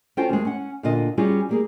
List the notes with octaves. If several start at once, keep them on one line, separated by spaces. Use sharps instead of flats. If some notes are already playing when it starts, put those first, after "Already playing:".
C#4 F4 F#4 A4 C5 G5
D#2 G#3
C#4 F#5
A#2 D3 F4 D#5
G3 C#4 F4 F#4 G#4
G3 A#3 G#4